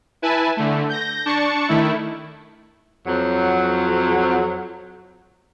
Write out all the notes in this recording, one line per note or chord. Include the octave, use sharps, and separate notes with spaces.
E4 B4 G#5 A5
D3 A3
G6 A#6
D4 A5 C#6 C#7
D#3 A3 E4
F2 F#3